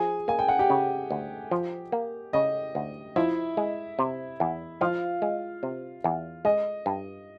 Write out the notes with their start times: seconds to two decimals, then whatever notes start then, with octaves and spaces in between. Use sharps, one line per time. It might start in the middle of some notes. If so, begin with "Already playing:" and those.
Already playing: F3 G#4 G#5
0.28 A#3 G#5
0.39 G5
0.48 F#5
0.59 G4 G5
0.70 C#3
1.11 D2
1.51 F3
1.92 A#3
2.33 C#3 D#5
2.75 D2
3.16 F3 E4 E5
3.57 G#3
3.99 C3
4.40 E2
4.81 F3 F4 F5
5.22 G#3
5.63 C3
6.04 E2
6.45 G#3 D#5
6.86 G2